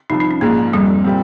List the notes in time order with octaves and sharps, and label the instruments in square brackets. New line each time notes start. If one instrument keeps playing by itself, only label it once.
[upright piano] C2 C3 F3 [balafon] D#4
[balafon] D#4
C#4
[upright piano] A#1 G#2 F3 [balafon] A#3
[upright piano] F1 F2 C3 [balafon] G3
[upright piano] A#2 G3 C4